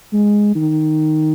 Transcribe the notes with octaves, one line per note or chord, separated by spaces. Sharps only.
G#3
D#3